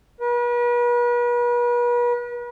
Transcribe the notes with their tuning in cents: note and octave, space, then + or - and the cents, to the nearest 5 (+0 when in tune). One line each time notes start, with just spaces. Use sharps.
B4 -40